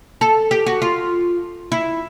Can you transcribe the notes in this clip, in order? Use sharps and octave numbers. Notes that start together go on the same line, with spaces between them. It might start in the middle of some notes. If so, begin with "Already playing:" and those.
A4
G4
F#4
F4
E4